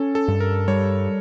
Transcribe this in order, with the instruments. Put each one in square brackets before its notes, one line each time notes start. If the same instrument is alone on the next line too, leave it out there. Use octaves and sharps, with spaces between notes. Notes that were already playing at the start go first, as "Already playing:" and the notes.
Already playing: [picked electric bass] C#4 [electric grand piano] A4
[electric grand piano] A4
[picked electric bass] G2
[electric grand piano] A#4
[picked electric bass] G3 [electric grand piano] C#5